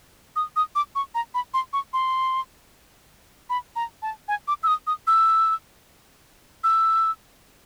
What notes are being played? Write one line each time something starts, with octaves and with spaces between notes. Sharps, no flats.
D#6
D#6
D6
C#6
A#5
B5
C6
C#6
C6
B5
A#5
A5
G#5
D6
E6
D#6
D#6
E6
E6